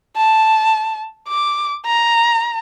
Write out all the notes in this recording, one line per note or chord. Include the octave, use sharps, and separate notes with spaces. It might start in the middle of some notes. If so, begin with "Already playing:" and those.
A5
D6
A#5